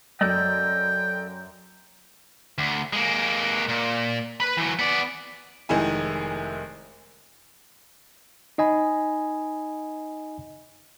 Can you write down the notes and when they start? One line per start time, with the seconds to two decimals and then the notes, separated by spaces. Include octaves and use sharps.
0.21 F#2 A4 D5 D#5 G5
2.58 D2
2.93 G#3 A#3
3.69 A#2
4.40 B4 B5
4.57 E3 F#3
4.79 B3 D5
5.69 F1 D#3 G#3 E4 G#5
8.58 D#4 D#5 G#5 B5